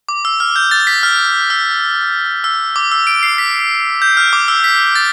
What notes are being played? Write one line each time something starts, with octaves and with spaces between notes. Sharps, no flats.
D6
E6
F6
G6
A6
B6
F6
E6
E6
D6
E6
D7
C7
B6
G6
F6
D6
E6
B6
A6